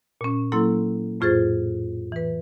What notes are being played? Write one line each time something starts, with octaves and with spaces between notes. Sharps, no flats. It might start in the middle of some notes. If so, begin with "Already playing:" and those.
A#2 C#4
F#3 A#3 E4 A4 C6 E6
F2 A2 F4 G#4 C5 A6
E3 B4